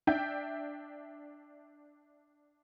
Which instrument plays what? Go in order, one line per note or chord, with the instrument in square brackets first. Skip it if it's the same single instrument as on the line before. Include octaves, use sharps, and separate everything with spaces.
[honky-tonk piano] D4 E5 G5 G6